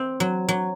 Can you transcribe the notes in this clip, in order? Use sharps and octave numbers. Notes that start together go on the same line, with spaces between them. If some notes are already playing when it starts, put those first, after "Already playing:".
Already playing: C4
F#3
F#3